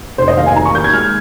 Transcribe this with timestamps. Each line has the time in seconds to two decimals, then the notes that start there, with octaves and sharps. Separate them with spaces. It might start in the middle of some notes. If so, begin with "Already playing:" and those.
0.18 F1 C5
0.28 D#5
0.37 D#2 F5
0.46 G#5
0.56 D#2 A#5
0.65 C#6
0.75 D#2 G6
0.84 G#6
0.93 G#3 F6